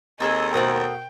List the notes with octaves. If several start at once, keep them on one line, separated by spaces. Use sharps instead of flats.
D#2 C4 G#4 A4 D#5
B2 A3 A#4 C5 F#5 G5 D#6